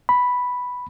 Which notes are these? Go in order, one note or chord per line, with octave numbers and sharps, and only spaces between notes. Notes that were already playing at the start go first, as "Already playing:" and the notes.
B5